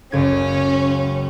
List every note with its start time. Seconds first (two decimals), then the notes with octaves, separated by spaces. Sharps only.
0.12 F#1 C#2 C#4 G#6